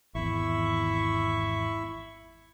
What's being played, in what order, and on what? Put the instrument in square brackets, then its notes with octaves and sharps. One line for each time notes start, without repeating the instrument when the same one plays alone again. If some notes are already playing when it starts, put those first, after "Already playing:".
[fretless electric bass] G#1 E2 [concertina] E4 E5 C#6